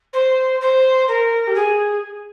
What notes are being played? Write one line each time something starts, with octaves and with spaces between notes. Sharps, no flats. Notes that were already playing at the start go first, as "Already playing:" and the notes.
C5
C5
A#4
G4
G#4